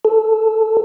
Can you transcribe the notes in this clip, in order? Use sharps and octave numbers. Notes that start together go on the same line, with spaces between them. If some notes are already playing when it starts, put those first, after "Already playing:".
A4